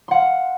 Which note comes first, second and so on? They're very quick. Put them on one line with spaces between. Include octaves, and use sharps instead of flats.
C6 F#5 F5